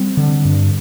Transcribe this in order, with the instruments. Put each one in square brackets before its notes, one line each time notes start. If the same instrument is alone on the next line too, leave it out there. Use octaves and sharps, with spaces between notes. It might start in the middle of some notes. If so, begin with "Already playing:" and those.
Already playing: [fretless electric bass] G3 C4
D3
G2